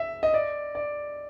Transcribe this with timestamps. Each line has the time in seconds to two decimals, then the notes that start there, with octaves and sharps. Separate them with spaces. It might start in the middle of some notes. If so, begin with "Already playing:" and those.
Already playing: E5
0.23 D#5
0.34 D5
0.75 D5